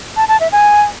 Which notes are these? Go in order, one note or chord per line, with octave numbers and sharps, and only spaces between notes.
A5
A5
E5
G#5